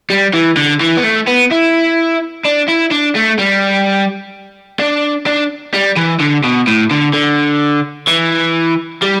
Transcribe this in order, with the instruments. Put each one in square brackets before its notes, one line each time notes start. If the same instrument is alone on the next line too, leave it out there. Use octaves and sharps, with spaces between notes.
[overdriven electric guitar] G3
E3
D3
E3
B3
A3
B3
E4
D4
E4
D4
A3
G3
D4
D4
G3
E3
D3
B2
A2
D3
D3
E3
G3